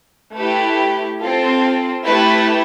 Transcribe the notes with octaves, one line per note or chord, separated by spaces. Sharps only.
A3 E4 G4 B4
C4 F4 A4
A3 E4 G4 B4